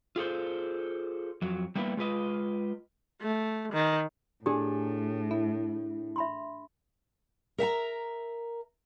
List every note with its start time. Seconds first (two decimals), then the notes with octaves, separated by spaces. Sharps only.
0.16 F4 G#4 A4 C5
1.42 F2 F#3
1.75 G3 A#3 B3 D#4 E4
1.97 G#3 F4 B4 D#5
3.22 A3
3.73 D#3
4.46 A2 D4 G4 G#4 G#5
5.31 E4
6.16 E5 B5 C6
7.58 A#4 E5 F#5 A#5